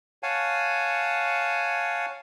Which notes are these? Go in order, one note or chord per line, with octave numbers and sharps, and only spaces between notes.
C#5 F5 F#5 G#5 A5